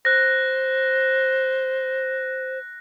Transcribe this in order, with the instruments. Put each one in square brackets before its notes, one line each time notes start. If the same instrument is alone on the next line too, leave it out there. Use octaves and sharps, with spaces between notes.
[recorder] C5 [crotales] F#6 A#6